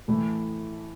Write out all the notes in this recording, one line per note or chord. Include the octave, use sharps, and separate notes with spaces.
A2 E3 A3 E4